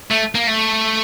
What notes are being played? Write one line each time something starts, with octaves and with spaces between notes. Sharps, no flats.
A3
A#3
A3